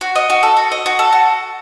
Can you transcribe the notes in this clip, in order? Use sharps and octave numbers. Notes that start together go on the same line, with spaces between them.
F#4
D#5
F#4
A4
F#4
D#5
F#4
A4
F#4